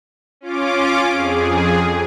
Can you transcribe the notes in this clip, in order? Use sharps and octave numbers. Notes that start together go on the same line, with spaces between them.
C#4 F4 D6
F2 G#4